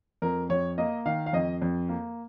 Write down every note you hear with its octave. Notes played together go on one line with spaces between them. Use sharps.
F2 A#4
F2 C#5
A#3 D#5
D#3 F5
F5
F2 D#5
F2
A#3